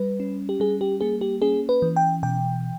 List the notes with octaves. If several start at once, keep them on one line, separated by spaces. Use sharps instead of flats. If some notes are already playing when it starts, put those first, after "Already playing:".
Already playing: G3 B4
C#4
G4
G3 G#4
G4
A#3 G#4
G4
C#4 G#4
B4
E3
G5
B2 G5